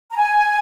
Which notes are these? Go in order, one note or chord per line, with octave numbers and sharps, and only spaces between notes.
A#5
G#5